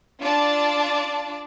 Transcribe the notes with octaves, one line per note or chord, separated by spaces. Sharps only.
D4 F4 D5 A5